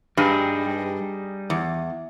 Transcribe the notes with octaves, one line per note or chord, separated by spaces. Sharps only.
G2 G3 D#4 G#4
E2